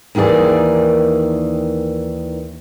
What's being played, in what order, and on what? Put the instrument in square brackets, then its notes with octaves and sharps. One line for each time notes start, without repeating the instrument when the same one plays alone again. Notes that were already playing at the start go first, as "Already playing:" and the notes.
[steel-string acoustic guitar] D#2 D#3 E3 G#4 D5